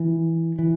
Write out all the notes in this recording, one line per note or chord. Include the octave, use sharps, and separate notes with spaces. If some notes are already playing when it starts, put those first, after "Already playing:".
Already playing: E3
E3